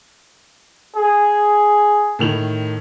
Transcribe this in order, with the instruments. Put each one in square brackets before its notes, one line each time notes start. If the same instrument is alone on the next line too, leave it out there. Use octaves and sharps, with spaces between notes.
[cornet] G#4
[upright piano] A2 D#3 F7